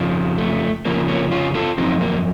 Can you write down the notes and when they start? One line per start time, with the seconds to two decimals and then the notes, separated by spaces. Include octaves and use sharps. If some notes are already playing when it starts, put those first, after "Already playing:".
Already playing: F2 C#3 F3
0.38 A3
0.85 F2 C#3 F3 A#3
1.08 A#3 C#4
1.31 C#4 F4
1.54 F4 A4
1.78 C#3 F3 C4 D#4
1.83 F#2
2.01 A#3